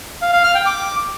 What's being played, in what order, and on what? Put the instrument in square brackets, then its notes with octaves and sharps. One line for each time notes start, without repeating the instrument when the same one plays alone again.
[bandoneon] F5
F5
F6
G5
D6